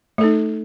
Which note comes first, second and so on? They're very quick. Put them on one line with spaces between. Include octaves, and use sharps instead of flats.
A3 A4 D#4